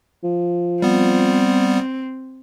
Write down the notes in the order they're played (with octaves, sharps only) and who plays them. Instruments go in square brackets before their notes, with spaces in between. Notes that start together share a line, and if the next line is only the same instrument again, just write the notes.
[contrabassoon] F3
[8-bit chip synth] G3 B3 [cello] C4